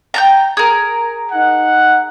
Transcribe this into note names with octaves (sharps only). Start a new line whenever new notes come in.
G5 A5 A#5
G#4 A#4
D#4 F#5